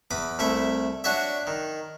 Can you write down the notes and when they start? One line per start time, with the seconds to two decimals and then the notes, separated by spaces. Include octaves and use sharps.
0.11 E2 B5 D6 D#6
0.39 C2 A3 E4 E5
1.04 D4 F#4 C#5 D5 E5
1.47 D#3